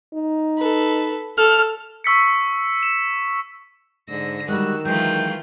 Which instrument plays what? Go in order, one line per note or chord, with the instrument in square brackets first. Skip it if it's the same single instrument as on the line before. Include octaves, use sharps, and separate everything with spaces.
[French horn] D#4
[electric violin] A4 B4
[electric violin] A4 [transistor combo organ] F6
[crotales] C#6 E6 B6 C#7
E7
[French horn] G#2 [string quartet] D3 E6 A#6
[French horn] D#3 [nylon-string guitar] G3 G#3 [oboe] F#4 [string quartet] E6
[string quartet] E3 A3 F4 [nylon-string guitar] F#3 G#3 [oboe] G5